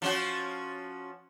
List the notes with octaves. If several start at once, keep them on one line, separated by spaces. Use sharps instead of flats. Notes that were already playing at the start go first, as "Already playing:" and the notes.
F3 C#4 F#4